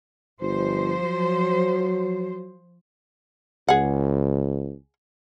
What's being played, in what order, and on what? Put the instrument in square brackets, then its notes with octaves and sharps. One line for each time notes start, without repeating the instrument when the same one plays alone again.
[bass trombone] G1 [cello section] F3 C5
[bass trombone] F#3
[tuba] C#2 [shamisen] G#4 F#5